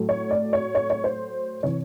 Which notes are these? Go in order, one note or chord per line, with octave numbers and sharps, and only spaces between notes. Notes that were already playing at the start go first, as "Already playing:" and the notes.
Already playing: A2 F#3 A3
C#5
D5
C#5
C#5
C#5
C5
C3 E3 C#5